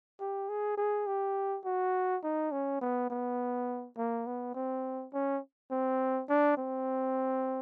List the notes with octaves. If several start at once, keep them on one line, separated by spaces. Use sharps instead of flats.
G4
G#4
G#4
G4
F#4
D#4
C#4
B3
B3
A#3
B3
C4
C#4
C4
D4
C4